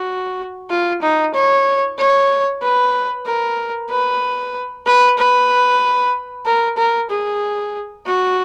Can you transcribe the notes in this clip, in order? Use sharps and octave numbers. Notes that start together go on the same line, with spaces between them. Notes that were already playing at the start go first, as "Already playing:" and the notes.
Already playing: F#4
F4
D#4
C#5
C#5
B4
A#4
B4
B4
B4
A#4
A#4
G#4
F#4